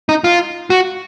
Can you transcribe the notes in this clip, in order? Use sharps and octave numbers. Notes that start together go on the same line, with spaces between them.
D#4
F4
F#4